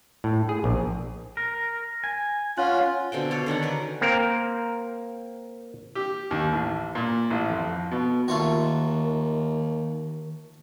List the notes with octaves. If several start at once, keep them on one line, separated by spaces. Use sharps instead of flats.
A2
G#4
A#1
A#4
G#5
C#4 F4 F#5
B2 D3 C4 G5
C#5 D5 F5
D3 D#3 C#4 F#5
A#4 B4
A#3 C4 A#4
G4
D#2
A1
A#2
A1
F2
B2
D#2 D#3 A3 F4 F#4